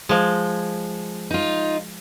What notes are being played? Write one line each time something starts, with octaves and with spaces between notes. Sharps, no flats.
F3 G#3
D#4 F4